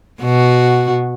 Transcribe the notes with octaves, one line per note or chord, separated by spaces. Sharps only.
B2 F#4